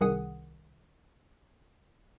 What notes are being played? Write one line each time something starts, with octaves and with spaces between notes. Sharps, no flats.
C2 D#3 G#4 F#5 D#6